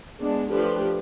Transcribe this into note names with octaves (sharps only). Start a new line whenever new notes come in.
G#3 B3 D4
F3 A3 D4 G4 B4